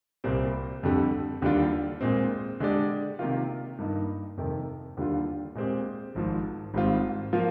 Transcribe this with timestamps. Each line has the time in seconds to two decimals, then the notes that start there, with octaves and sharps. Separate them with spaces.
0.24 C2 A#2 G3 C4
0.83 F2 D3 G3
1.42 D#2 D3 G3 D4 F4
2.01 A#2 G#3 C4
2.60 D3 G#3 D4 G4 D5
3.19 C3 D#3 A#3 F4
3.78 G2 D#3 A#3 D#4
4.37 F2 C3 D#3
4.97 D#2 D3 G3 D4 F4
5.55 A#2 G#3 C4 G4
6.15 G#1 G#2 F3
6.74 G#1 G#2 G3 C4 F4
7.33 F3 A#3 F4